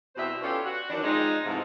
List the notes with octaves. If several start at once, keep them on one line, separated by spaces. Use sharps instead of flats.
E2 B2 G3 C4 C5 E5
C#4 F4 G4 A4 B4 D5
F#4
D#3 E3 F#3 D4
F3 G#3 C4 D#4
G#2 C3 E3 F3 A3